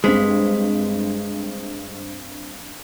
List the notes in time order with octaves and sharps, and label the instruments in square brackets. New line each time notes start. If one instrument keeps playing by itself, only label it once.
[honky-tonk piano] G2 C4 B6 [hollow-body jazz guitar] G#3